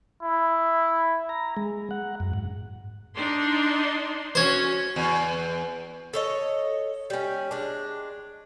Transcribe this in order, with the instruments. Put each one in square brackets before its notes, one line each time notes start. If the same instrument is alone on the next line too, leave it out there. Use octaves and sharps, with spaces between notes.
[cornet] E4
[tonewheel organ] A#5
G#3
F#5
F#2
G#2
[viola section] D4 D#4 C6
[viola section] C#4 F#4 [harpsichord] C5 C#5
[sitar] E2
[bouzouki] A4 C#5 D#5
G3 C#4
G#3 D4